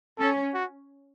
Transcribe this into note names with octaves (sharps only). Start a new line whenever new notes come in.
C#4 A4
F#4